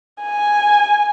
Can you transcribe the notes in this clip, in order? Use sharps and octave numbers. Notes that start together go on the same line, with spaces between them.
G#5